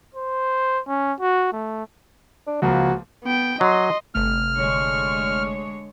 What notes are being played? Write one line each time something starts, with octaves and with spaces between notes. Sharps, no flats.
C5
C#4
F#4
A3
D4
C#2 F3 A#3 F#4
B3 G5
F#3 D#5 C6
G1 C3 A3 F6
D3 G#3 C#5